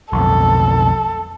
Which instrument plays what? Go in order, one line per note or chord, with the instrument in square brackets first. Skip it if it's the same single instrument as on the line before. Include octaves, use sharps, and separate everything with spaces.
[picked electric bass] B1 F2 [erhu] A4